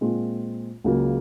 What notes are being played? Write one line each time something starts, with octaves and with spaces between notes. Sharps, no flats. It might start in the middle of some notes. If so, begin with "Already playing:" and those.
A#2 G#3 C4 F4
C#2 C#3 F#3 A#3